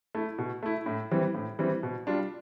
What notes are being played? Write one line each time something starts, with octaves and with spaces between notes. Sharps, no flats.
A3 E4
B2
A3 E4
A2
E3 G3 C4
A2
E3 G3 C4
B2
G3 D4 F4